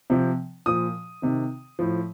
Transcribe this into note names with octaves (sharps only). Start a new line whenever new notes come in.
C3 F3
A#2 F3 D#6
C3 D#3
A2 F3